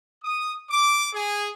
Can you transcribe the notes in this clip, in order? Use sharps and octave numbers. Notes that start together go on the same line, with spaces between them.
D#6
D6
G#4